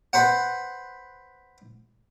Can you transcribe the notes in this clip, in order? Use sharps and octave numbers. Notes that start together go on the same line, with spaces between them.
B4 C5 F#5